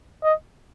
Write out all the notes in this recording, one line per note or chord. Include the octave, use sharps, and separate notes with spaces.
D#5